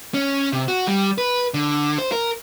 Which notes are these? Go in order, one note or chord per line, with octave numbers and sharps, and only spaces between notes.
C#4
C3
F#4
G3
B4
D3
C5
A#4